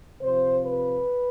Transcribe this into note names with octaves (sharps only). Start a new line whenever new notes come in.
C3 F3 C5
B4